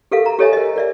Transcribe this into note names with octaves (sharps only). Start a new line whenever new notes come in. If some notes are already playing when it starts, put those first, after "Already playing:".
G4 A4 A#4 E5 F5
A#5
G4 A4 C#5 D#5 E5 G#5
A#4 D#5
A#4 D5 E5